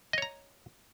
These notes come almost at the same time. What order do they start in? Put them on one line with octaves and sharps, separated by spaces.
D#5 C#5 A#5